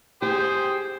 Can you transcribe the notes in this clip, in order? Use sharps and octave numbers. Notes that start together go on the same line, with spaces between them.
G4 G#4 C5 G5